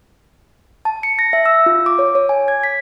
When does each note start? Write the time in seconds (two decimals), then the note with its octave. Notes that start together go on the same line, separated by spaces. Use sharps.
0.85 A5
1.03 C#7
1.19 A#6
1.33 E5
1.46 E6
1.66 F4
1.86 D6
1.99 C#5
2.15 C#5
2.29 G#5
2.48 G#6
2.63 B6